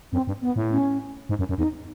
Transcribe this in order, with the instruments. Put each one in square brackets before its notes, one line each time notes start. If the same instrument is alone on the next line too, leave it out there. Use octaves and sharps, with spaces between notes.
[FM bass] F#2 [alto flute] C4
[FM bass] G2
[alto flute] B3
[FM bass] A2
[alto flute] C#4
[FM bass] G#2
F#2
F#2
[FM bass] E2 [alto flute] D#4